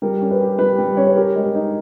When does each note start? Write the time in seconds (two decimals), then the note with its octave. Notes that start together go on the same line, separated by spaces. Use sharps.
0.02 G3 A#4
0.21 C#4
0.31 B4
0.40 G4
0.59 G3 B4
0.78 G3
0.97 C#4 C#5
1.07 B4
1.16 G4 A#4
1.35 G#3
1.55 D#4